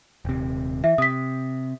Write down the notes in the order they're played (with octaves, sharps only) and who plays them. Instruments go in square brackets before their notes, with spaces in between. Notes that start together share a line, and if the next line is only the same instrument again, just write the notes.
[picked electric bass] D#1 C3
[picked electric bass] E3 [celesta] E5
[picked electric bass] C3 [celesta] D#6 B6